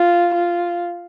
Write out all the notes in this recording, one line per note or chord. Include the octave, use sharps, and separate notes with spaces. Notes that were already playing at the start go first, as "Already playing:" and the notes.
Already playing: F4
F4